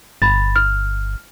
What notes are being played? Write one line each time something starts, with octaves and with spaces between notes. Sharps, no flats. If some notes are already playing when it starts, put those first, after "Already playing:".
G1 B5 A6
F6